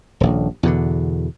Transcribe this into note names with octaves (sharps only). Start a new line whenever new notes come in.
D#1 A#1
E2 B2 D3